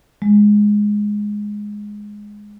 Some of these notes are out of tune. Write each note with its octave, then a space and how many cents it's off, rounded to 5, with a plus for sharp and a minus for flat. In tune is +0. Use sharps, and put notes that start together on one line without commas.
G#3 +0